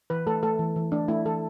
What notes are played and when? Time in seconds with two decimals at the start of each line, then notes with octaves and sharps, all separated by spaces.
0.10 E3 B4
0.27 A3 A4
0.43 A3 A4
0.59 E3
0.76 E3
0.92 A3 D4
1.08 A3 E4
1.25 E3 A4